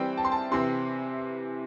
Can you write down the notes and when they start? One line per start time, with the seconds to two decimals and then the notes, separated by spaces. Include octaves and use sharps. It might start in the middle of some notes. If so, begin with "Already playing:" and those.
Already playing: E3 G3 C4 G5
0.18 A5
0.25 C6
0.32 A5
0.51 C3 E3 C4 C6